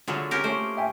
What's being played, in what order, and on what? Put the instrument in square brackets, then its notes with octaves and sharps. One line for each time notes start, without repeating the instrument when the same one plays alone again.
[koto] D3 F#3 A3 [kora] F4 G#4
[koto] C#4 G4 A#4
[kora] A3 A#3 C#4 [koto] C5
[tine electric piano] E5 G5 G#5